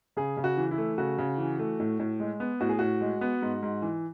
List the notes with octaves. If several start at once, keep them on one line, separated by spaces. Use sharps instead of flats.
C#3 G#4
C#3
F#4
E3
E4
A3
C#3 F#4
C#3
E3
A3
A2
A2
G#3
B3
A2 F#4
G#4
A2 F#4
G#3
B3
G#2
G#2
E3